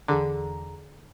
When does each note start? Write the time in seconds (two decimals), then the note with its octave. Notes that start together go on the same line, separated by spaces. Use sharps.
0.08 E2 D3 G#4 A#5